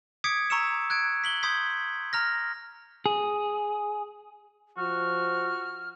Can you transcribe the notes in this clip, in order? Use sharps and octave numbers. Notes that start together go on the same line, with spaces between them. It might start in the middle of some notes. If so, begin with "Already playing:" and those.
D6 D#6 G#6 B6 C#7 D7
A#5 C#6 E6 C#7 E7
F#6 G#6 D7
B6 F#7 G7
C6 D#6 G6 G#6 B6
A#5 F6 A#6
G#4
F3 F#4 F6